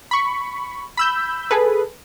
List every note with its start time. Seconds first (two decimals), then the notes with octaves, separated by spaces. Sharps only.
0.11 B5 C#6
0.97 B5 E6 G6
1.51 G#4 A4 B4